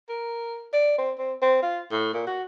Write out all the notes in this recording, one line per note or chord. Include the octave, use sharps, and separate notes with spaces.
A#4
D5
C4
C4
C4
F4
A2
A#2
F#4